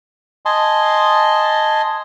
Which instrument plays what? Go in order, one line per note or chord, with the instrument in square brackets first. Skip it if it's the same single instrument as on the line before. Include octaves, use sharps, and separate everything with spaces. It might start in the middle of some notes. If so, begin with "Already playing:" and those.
[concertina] D#5 G#5 A5 C6